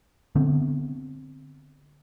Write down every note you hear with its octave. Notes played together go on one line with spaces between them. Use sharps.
D3 B3 C4